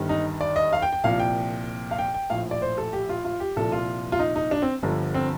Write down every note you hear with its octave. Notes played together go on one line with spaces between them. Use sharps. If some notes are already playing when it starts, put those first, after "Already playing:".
Already playing: G1 G2 D#3
D#4
D5
D#5
F5
G5
G5
C2 A#2 F3 F5
G5
F5
G5
G5
A#1 A2 F3 F5
D5
C5
A4
G4
F4
F4
G4
C2 A#2 F3 A4
F4
F4
D#4
D#4
D4
C4
G1 G2 D3 F3
C4